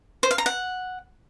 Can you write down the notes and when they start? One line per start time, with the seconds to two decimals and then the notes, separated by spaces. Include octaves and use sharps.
0.23 C5
0.31 F5
0.38 A#5
0.46 F#5